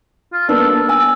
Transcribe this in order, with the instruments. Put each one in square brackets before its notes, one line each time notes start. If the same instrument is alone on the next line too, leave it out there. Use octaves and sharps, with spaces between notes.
[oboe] F4
[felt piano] A#3 B3 D4 [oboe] A4
[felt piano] G#5 [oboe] E6